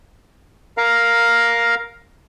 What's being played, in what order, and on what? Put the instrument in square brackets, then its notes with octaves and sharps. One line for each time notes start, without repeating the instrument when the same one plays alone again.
[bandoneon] A#4 F5 A#5